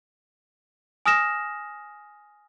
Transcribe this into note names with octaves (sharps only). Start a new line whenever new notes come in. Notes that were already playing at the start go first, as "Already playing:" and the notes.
G#5 D#6 F6 A#6 E7